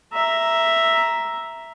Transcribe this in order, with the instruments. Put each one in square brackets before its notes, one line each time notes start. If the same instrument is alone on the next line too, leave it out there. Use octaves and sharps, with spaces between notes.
[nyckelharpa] E5 A#5